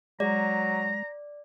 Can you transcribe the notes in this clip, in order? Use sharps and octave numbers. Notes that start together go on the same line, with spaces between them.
F#3 G#3 D5 A#5